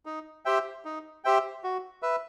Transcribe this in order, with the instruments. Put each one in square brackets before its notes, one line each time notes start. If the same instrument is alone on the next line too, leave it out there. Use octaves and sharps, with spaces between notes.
[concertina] D#4
G4 C5 E5 G5
D#4
G4 C5 E5 G5
F#4
B4 E5